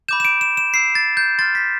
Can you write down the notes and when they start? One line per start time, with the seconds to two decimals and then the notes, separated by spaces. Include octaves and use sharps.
0.08 B5 D6 G6 E7
0.20 E7
0.25 D7
0.41 E7
0.57 E7
0.73 B5 E6 G6 C7
0.95 A6
1.17 G6
1.39 C6 F6 A6
1.55 B6